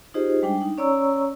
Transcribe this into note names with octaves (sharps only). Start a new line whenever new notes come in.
D#4 F4 G4 G#4 C5 D#5
G3 G#3 D4 G5
D#4
C#4 C#5 D5 A#5 C#6 E6